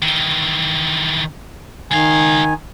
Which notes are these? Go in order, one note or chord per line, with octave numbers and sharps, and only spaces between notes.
D#3 E3
C#2 D#3 F5 G#5